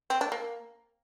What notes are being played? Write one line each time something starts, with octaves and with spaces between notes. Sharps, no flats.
C4
D4
A#3